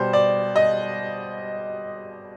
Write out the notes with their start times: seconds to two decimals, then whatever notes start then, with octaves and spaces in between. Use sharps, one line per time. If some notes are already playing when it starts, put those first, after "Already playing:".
Already playing: B2 G3 C5
0.13 D5
0.56 D#5